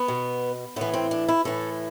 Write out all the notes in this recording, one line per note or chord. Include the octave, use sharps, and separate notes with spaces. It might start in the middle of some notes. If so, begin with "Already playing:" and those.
Already playing: B3
B2
A2 E3 B3
C4
D4
E4
A2 E3 A4